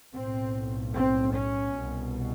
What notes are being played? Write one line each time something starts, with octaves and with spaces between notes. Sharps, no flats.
B1 A2 C4
C4
C#4
C2 B2